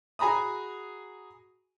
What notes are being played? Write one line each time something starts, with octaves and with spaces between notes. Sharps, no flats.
F#4 G#4 G#5 A#5 B5 D#6